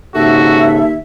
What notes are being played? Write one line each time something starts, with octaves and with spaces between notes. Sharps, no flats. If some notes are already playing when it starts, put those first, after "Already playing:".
D#2 G#2 C#3 F#4 A4 E5